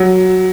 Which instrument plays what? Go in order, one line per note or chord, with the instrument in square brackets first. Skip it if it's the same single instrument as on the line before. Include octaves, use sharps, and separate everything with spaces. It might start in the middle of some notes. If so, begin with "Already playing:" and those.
Already playing: [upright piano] F#3